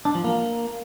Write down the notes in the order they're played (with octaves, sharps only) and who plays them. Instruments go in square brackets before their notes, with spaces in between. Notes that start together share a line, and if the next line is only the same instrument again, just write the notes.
[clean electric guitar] D4
F3
A#3